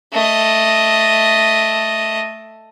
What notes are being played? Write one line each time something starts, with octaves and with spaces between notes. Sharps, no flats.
A3 D#5